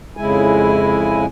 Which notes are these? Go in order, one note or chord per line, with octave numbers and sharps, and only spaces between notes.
F2 C#3 G#3 E4 G#5